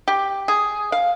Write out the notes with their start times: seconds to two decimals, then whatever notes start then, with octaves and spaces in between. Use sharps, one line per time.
0.08 G4
0.48 G#4
0.92 F5